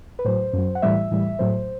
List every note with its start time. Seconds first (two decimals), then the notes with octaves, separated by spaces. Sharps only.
0.19 B4
0.25 A2 F#3 C5
0.53 F#2 F#3
0.75 F#5
0.82 A2 E3 G3 E5
1.11 A2 E3 G3
1.39 A2 F#3 C5